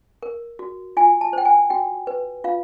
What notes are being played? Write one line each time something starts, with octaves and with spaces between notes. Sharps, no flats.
A#4
F#4
F4 G#5
A5
C5 G5
G#5
F#4 G5
B4
F4 F5